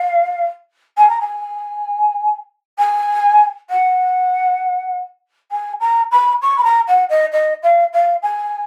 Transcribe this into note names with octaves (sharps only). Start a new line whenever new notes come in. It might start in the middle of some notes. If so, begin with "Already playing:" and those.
Already playing: F5
G#5
A#5
G#5
G#5
F#5
G#5
A#5
B5
C#6
B5
A#5
F#5
D#5
D#5
F5
F5
G#5